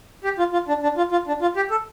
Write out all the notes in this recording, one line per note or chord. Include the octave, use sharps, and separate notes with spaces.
G4
F4
F4
D4
D4
F4
F4
D4
F4
G4
A4